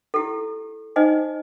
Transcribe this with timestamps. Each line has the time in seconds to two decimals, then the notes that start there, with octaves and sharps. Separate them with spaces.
0.14 E4 G4 A4
0.96 D#4 C5 D#5 G#5